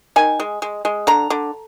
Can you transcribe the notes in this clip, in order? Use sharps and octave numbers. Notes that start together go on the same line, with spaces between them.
D#3 G#5
G#3
G#3
G#3
D3 A#5
D3